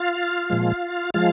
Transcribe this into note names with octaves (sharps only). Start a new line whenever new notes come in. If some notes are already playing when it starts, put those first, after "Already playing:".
Already playing: F4 F5
A#2 F3 G#3
F3 G#3 F4 F5